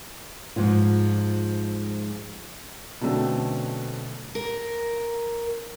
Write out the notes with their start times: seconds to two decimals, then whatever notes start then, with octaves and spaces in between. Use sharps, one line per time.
0.56 G#2 F3 G#3 F4
3.01 B2 D3 F#3 A3 C4 C#4
4.35 A#4